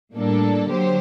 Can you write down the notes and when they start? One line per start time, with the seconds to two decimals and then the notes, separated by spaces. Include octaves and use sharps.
0.14 A2 G3 A#3 D4 A4
0.69 D3 F#3 G4 C5